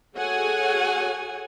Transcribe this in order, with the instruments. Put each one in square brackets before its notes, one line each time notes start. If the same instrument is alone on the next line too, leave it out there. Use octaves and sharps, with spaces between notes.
[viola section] F#4 G#4 A4 C#5 F#5 G#5